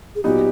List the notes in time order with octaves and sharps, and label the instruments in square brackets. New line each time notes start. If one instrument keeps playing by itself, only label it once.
[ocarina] G#4
[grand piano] A#2 F#3 B3 D#4 [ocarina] G4